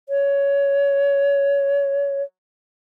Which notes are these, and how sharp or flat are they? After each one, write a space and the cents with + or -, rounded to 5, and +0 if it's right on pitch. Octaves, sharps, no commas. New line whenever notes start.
C#5 +15